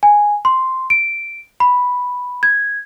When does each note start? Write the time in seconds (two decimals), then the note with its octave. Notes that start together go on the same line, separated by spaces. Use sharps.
0.03 G#5
0.45 C6
0.90 D7
1.60 B5
2.43 G#6